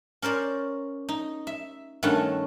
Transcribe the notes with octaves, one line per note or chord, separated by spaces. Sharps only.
C#4 A#4 C5 D5
D#4
E5
G2 D#3 A3 C#4 F#5 A5